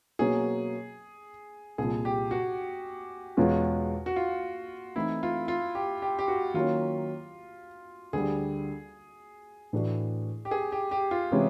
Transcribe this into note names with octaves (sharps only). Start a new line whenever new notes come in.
B2 F#3 A#3 C#4 F#4 G#4
C2 A#2 F3 G#4
G4
F#4
E2 B2 G#3 C#4 F4
F#4
F4
E3 A3 C4 D#4 E4
F4
F4
G4
G4
G4
F#4
D#3 F#3 A#3 C#4 F4
D2 D3 G3 G#4
A2 E3 A3 D4 F#4
G4
G#4
G4
G4
F4
C3 E3 G#3 C#4 E4